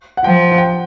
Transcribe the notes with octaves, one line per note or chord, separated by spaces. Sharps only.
F#5
F3 G5
G5